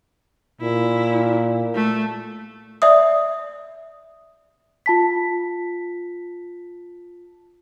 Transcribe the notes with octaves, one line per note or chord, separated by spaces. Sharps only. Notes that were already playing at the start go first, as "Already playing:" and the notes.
A#2 E4
A3
D5 E5 D#6
F4 A5 B6